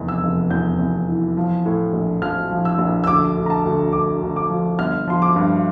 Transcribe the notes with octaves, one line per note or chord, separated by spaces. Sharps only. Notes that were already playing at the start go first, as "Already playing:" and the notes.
Already playing: F1 E2
E6
F1
E2 G6
E2
E3
F3
A2
A#1
F3 F6
F3
E6
A#1
E6
D2 D6
D2
A#5
A5
D2
D2 D6
D2
D6
F3
G1 F6
F3 C6
D6
G2